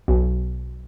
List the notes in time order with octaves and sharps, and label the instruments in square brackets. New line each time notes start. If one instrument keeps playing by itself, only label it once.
[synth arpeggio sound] B1